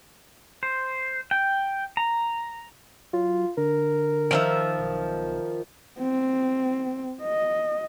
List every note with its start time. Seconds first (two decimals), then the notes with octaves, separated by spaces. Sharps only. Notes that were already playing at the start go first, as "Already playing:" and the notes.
0.63 C5
1.31 G5
1.97 A#5
3.13 F#3 F4
3.57 D3 A#4
4.31 D#3 F3 E5
4.79 B1
5.99 C4
7.23 D#5